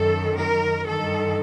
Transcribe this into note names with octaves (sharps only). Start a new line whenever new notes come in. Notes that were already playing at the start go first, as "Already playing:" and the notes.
Already playing: F#2 D#3 A4
A#4
G2 D#3 A4